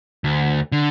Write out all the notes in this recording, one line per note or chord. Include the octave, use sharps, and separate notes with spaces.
D2
D3